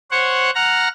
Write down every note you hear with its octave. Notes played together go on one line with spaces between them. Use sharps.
C5 C#5 F#5
F#5 A#5 F6